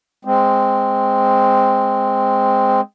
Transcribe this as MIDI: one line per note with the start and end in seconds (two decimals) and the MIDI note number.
0.25 2.81 56
0.25 2.81 60